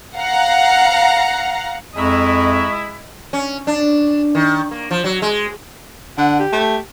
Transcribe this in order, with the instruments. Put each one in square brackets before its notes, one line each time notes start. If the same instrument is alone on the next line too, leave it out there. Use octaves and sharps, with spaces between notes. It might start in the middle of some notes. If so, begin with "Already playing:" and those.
[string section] F5 F#5 A#5
[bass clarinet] F2 [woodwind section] G#3 E4 [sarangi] D#5 [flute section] E5 A#5 C#6
[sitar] C#4
D4
D#3
A#3
F3
F#3
G#3
[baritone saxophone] D3 [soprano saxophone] F#5
[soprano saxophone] G4
[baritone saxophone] A3